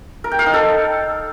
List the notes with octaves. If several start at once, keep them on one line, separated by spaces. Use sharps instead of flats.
A#4
G5
F5
D#4
A4